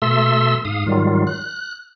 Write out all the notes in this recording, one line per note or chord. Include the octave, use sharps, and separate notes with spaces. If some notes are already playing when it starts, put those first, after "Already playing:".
B2 A3 A4 E5 C6 E6
G#2 F5 D#6
G#2 D#3 F#3 G3 F4
F#6